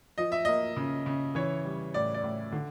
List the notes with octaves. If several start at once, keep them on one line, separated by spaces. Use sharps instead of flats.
F3 D#5
E5
A#3 D#5
C#3
C#3
E3 C#5
G3
A2 D5
D5
A2
D3